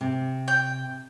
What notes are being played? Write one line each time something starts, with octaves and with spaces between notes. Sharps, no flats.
C3
G5